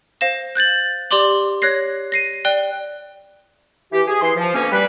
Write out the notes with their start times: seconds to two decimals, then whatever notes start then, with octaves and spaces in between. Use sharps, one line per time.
0.21 C5 F5 A#6 E7
0.55 F#6 G6 A6 F#7
1.11 G4 D5 C6 D6 F#7
1.62 C#5 F#6 G#6 A#6 C7
2.12 A#6 C7 D#7
2.45 D5 G5 F#6 G7
3.92 E3 G4
4.07 G#4
4.21 E3 C6
4.37 F3
4.54 D2 B2 A#3 C#4
4.72 G3 B4